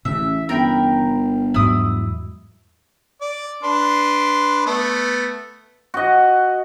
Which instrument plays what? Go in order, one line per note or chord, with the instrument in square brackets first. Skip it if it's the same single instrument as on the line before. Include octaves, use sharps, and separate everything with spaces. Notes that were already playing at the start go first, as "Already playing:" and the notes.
[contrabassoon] A1 [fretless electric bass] C#3 E3 [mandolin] E5
[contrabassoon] G1 [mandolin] A#4 G5 B5
[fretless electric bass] E2 G#2 F#3 [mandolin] E4 D#6
[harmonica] D5
D4 B4 C6
A3 B3
[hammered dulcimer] F#4 D#5